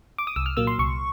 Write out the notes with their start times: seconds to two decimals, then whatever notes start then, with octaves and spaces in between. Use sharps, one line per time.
0.18 D6
0.27 D#6
0.36 C2 E6
0.46 F6
0.57 A#2 F#3 A#3 E6
0.67 C6
0.78 C2 C#6